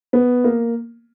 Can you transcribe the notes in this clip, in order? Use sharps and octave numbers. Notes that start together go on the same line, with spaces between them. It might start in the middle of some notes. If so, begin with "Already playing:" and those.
B3
A#3